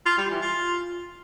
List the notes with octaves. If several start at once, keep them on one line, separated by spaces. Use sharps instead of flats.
F4
G3
E3
F4